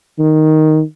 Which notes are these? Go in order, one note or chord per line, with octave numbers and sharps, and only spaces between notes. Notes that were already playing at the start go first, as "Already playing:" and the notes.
D#3